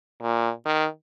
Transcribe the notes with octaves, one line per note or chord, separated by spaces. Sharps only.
A#2
D#3